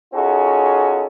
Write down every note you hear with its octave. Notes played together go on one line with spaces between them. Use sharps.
C#4 D#4 F4 F#4 G#4 A4